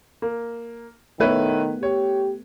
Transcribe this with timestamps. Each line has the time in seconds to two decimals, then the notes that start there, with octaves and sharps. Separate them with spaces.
0.22 A#3
1.20 D#3 A3 B3 E4 B4 C#5
1.83 G4 C#5